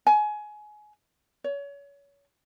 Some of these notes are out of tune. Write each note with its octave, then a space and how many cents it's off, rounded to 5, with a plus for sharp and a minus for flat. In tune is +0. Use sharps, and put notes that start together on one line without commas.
G#5 +25
C#5 +30